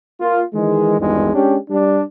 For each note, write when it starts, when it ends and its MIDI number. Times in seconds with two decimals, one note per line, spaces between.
0.20 0.41 58
0.20 0.41 65
0.53 0.97 51
0.53 0.97 52
0.53 0.97 56
0.99 1.29 32
0.99 1.29 40
0.99 1.29 43
0.99 1.29 51
0.99 1.29 56
1.33 1.57 56
1.33 1.57 61
1.33 1.57 62
1.33 1.57 67
1.70 2.01 55
1.70 2.01 62